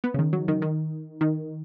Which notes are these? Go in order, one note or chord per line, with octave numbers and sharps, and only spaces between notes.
B3
C#3
D#3
F#3
D#3
D#3
D#3